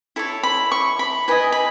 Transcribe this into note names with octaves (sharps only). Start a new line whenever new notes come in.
E4 A4 C#5
B5
C#6
B5
E4 B4 D#5 G#5
B5